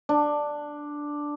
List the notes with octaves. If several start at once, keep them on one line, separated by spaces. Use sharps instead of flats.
D4